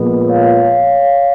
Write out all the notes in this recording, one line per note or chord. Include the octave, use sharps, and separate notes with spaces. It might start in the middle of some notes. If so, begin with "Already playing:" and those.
Already playing: A#2 F3 G#3 B3
C#5 F5